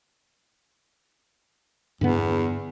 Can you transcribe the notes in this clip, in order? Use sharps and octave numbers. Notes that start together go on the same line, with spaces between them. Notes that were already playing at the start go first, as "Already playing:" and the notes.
E2 G2 D3 B3